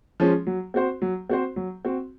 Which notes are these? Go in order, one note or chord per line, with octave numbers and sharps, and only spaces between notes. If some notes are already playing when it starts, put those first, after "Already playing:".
F3 G#3 C#4
F#3
C4 F#4 C5
F#3
C4 F#4 C5
F#3
C4 F#4